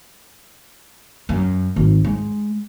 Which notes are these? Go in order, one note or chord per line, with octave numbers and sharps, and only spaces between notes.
F#2
G#1
G#3